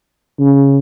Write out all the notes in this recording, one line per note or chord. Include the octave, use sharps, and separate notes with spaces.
C#3